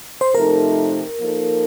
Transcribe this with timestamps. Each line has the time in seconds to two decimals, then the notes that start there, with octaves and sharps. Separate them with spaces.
0.21 C5
0.34 C3 F3 A3 D#4 A4 A#4
1.19 F3 A#3 D#4 A4